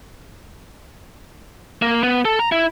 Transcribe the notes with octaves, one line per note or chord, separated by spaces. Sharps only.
A#3
B3
A4
A#5
E4